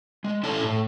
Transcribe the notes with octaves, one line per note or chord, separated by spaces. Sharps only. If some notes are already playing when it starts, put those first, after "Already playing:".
G#3
C#4 E4 A4 C#5 A5
A2